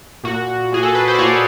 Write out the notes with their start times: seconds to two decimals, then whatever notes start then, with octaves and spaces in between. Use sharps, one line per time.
0.24 A#2 F#4
0.72 A#2 G#4
0.83 A4
0.95 B4
1.08 C5
1.14 D5
1.19 A#2 C#5